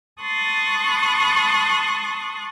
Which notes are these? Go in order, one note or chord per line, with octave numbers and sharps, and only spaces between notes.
A5 C6 C#6 D#6 F#6 A6